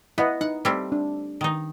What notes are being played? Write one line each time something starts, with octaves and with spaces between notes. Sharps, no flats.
B3 E4 D#5 F#5
D#4 F#5
G3 A3 C4
D4
D#3 D#4